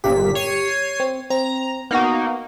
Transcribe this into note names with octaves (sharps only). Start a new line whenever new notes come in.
G1 A#2 G4 B6
C#5 C7 D#7
C4
C4 A#5
A#3 B3 D#4 F#4